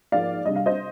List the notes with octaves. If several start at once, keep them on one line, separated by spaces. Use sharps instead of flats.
G#2 F3 A#3 D5 F5
C3 G3 D4 D#5
F5
C5 D#5